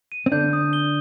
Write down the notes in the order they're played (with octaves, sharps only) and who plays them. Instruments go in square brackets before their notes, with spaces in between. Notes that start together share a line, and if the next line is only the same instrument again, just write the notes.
[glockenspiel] D#7
[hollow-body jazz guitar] C4
[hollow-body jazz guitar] D3 D4 [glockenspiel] G6
[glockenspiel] D#6
G7